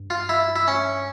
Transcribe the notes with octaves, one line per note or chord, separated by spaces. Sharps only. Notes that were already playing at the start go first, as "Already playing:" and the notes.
Already playing: G2
F4
E4
E4
C#4